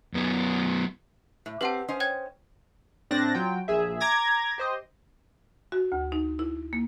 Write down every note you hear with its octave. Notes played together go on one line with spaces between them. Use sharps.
F#2 B3
A2
C4 G4 B4 F#5 A5
C#4 C5 D#5
C#5 G5 G#6
A2 C4 D4 F#6 A6 A#6
F#3 F4 G5
A#1 G#4 E5
A#5 D6 G#6 A#6
G4 C5 D#5
F#4
D2
D#4
E4
A#3